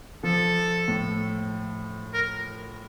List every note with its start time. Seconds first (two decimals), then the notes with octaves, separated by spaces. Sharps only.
0.24 F3 A4
0.88 A2
2.14 A#4